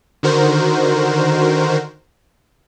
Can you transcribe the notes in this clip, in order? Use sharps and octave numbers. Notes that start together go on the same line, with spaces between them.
D3 D#3 F#4 A#4 C5